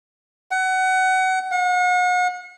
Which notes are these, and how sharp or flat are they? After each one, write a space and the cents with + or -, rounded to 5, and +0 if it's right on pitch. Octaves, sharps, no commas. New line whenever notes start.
F#5 +25
F#5 -40